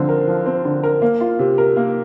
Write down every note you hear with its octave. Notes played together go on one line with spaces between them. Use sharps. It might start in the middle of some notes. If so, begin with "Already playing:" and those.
Already playing: D3 F3 C4
A#4
F3
C4
D3
A#4
A#3
F4
C3
A#4
A#3